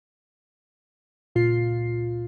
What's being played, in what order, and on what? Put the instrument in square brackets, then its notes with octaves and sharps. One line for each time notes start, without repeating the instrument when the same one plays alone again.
[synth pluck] C#2 A#2 F4 C7